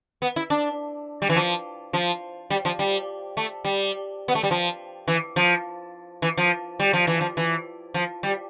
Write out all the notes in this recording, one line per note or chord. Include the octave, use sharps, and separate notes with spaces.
B3
E4
D4
G3
E3
F3
F3
G3
F3
G3
A3
G3
B3
A3
G3
F3
E3
F3
E3
F3
G3
F3
E3
F3
E3
F3
G3